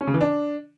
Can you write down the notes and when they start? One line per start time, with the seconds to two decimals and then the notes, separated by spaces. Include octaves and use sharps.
0.01 C#4
0.07 C#3
0.14 E3
0.21 D4